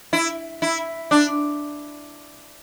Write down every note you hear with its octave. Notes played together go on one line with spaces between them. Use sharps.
E4
E4
D4